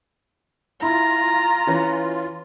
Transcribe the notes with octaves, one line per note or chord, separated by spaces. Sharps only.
E4 F4 A#5 B5
E3 C#4 B4